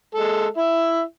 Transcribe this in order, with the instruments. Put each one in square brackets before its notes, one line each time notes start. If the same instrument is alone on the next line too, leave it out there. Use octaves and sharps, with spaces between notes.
[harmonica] G#3 A4
E4 E5